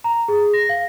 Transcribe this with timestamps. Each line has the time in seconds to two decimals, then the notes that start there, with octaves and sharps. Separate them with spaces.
0.04 A#5
0.28 G#4
0.54 A#6
0.69 F5